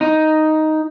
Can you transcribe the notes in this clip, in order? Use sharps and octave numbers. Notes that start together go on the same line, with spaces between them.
D#4